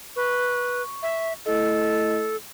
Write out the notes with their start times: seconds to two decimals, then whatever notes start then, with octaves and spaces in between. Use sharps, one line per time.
0.16 B4 C#6
1.03 E5
1.46 A3 E4 A4 D#5